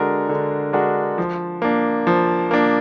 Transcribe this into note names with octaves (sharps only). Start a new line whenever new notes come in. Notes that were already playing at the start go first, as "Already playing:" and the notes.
Already playing: D3 G#3 D4 F#4 A#4
D3
G#3 D4 F#4 A#4
F3
A#3 D4
F3
A#3 D4